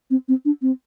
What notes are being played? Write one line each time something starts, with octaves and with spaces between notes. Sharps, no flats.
C4
C4
D4
C4